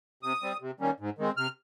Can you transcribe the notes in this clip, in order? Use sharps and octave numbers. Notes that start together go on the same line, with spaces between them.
C3 D#6
G3 C4
C3
D#3 G3 A#3 C#4
G#2
D#3 G#3 C4
C3 F6